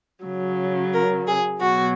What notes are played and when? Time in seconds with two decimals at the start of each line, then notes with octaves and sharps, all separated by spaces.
0.24 C#3 F#3
0.93 A#4
1.27 G#4
1.60 B2 F#3 F#4